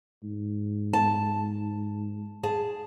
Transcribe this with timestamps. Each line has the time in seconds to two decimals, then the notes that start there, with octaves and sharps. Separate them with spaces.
0.23 G#2
0.93 A5
2.43 G#4 A5